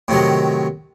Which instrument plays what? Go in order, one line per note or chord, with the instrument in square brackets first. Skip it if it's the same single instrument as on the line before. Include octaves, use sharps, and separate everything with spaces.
[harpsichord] A2 C3 D#3 F#3